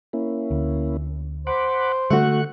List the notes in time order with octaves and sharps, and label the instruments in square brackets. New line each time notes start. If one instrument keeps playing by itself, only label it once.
[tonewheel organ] A#3 C#4 E4
[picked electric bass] D2
[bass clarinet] C5 [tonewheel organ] F#5 B5 D6
[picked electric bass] D3 [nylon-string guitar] A3 F#4 [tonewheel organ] C#6 F#6